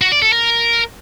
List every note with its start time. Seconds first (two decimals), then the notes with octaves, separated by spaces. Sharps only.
0.01 F#4
0.12 D5
0.22 A4
0.33 A#4